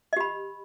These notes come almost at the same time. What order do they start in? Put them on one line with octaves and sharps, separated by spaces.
D#5 G4 B5